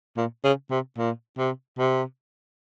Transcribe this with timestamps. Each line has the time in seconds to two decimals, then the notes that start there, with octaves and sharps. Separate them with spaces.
0.17 A#2
0.44 C#3
0.71 C3
0.98 A#2
1.38 C3
1.78 C3